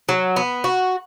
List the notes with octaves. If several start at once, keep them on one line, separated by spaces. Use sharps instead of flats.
F#3
B3
F#4